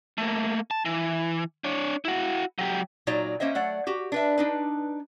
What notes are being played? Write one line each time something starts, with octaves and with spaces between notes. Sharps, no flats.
A3 A#3
A5
E3
D4 C#5
E4 F#4
F#3 G4
A#2 F#3 D#4 D5 A#5
A#3 C#4 C5 D#5 E5
F#3 A3 D5 F#5
F#4 G4
D4 B4 E5
D4 D#4 B4